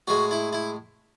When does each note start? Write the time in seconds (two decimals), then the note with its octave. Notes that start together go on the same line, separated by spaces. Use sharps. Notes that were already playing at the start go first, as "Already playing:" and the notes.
0.08 A2 G#3 F#4
0.31 E4
0.53 E4